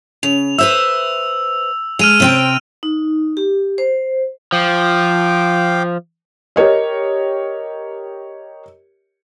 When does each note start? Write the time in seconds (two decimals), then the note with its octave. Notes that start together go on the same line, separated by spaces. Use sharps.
0.23 C#3 F7
0.59 B4 C5 E5 E6
1.99 G#3 F6 D#7 F7
2.20 C3 C4 G5
2.83 D#4
3.37 G4
3.78 C5
4.52 F3 F5 G5 D6
6.56 G4 A#4 C#5 D#5